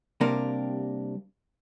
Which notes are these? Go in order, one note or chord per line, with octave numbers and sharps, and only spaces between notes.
C3 G3 A#3 D4 A#4